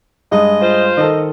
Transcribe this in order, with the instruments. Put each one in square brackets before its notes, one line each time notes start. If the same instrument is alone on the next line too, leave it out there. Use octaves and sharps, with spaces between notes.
[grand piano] G2 G#3 D#6 [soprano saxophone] D#5
[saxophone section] F4 C5
[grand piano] D#3 A4 [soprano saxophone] D#5